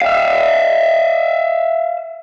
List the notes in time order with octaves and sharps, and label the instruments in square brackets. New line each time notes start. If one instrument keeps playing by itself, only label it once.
[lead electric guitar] E5 F5